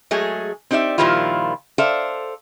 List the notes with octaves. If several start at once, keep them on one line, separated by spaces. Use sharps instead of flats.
F#3 G#3 A3 G#4
C4 D#4 G4 D5 E5
A#2 D#3 F3 G3 E4 F4
A4 C5 D5 E5 F5